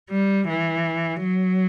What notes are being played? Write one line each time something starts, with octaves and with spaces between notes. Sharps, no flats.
G3
E3
F#3